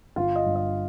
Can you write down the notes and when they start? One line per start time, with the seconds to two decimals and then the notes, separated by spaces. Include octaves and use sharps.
0.16 G1 F4 F5
0.36 D#5
0.46 G2
0.56 D#5